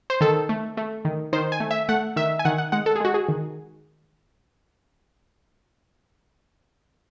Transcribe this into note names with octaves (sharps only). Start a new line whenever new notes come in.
C5
D#3 A4
A3
A3
D#3
D#3 C5
G#5
A3
E5
A3 F#5
D#3 E5
G#5
D#3 F#5
F#5
G#3 F#5
A4
G#4
G#3 F#4
G#4
D#3